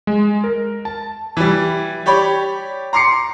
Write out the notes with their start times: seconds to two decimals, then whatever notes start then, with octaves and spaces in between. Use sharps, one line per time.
0.07 G#3
0.44 A#4
0.85 A5
1.37 E3 G3
2.06 G4 C#5 D5 B5
2.93 A#5 C6 D6 C7 C#7